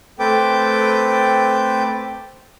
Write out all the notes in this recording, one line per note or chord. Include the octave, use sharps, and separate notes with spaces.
A3 C4 A4 B4 G5 D6